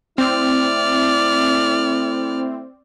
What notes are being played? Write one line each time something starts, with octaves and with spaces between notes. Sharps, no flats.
A3 C4 E4 D5 F6